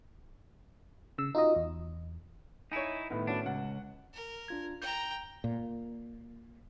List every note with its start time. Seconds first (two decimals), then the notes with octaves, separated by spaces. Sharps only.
1.18 C#3 E6
1.35 D#4 F4 F#4 D#5
1.56 E2
2.72 D#4 E4 C#5 G#5
3.10 A2 D#3 B3
3.27 C#4 D4 F#4
3.46 C#2 F#5
4.13 A#4
4.48 D4 F4 G#6
4.82 G5 A#5 G6
5.44 A#2